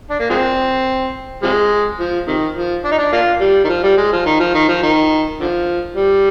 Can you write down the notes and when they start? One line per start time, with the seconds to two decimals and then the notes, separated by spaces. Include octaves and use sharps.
0.10 D4
0.20 A#3
0.30 F3 G#3 C4
1.43 C3 F3 G#3
1.99 F3
2.27 C3 D#3
2.56 F3
2.84 D4
2.91 D#4
2.98 D4
3.12 A#3 D4 F4
3.41 G3
3.65 D#3
3.69 F3
3.84 G3
3.98 G#3
4.13 F3
4.26 D#3
4.40 F3
4.55 D#3
4.69 F3
4.83 D#3
5.40 D3 F3
5.96 G3